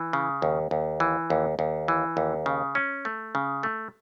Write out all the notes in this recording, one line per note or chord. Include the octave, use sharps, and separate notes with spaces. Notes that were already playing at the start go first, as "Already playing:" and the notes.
Already playing: E3
C#3
D#2
D#2
E3
D#2
D#2
E3
D#2
C#3
C#4
A3
C#3
A3